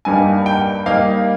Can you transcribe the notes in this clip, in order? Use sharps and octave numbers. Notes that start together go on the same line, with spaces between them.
G2 G3 A#3 D#4 G#5
G5
G3 A#3 D#4 F5